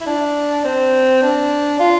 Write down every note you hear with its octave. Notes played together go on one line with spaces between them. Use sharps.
E4
D4
C4
D4
F4